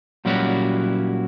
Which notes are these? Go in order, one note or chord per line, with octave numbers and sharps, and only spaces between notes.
A#2 F#3 G3 C#4 E4 F#4